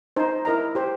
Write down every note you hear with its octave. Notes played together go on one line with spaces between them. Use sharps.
D#4 C5
E4 A#4 D#5 A#5
G4 C5